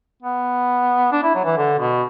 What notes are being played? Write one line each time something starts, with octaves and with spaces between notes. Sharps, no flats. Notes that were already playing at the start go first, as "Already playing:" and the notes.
B3
D4
E4
F#3
E3
D3
B2